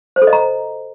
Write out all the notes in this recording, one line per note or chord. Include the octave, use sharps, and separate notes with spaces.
C5
A4
D#5
A#5